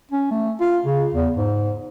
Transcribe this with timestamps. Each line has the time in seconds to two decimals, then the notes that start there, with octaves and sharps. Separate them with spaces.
0.11 C#4
0.31 A3
0.61 F4
0.86 C#3
1.14 E2
1.36 G#2